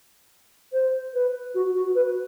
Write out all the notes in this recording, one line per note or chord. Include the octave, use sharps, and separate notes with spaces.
C5
B4
F#4
F#4
B4